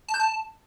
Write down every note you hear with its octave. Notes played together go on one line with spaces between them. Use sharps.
A5
G6
A5